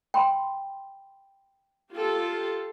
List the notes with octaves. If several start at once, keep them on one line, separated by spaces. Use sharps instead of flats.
G5 B5 C6
F4 G4 A4